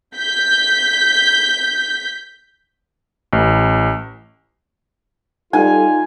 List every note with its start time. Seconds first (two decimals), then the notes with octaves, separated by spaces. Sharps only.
0.17 G6 B6
3.33 A1
5.53 G3 D#4 F4 A4 G#5